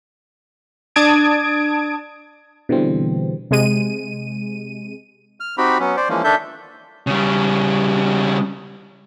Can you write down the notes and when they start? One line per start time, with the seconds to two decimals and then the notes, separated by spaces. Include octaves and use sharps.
0.96 D4 A5 D#6 G#6 D7
2.69 B2 D3 E3 G3 C4
3.51 C3 G#3 D#7
5.40 F6
5.58 C4 D#4 F#4 G4 B5
5.80 F#3 B3 C#4
5.97 C5 D5
6.09 E3 F3 G#3 A#3 C#4
6.24 D#3 D4 A4 E5 G6
7.07 C#3 G3